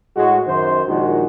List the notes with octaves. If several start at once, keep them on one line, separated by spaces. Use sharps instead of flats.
A2 G#3 F#4
F#2 D#3 C5
A#1 D#2 A#2 D#3 G#3 F#4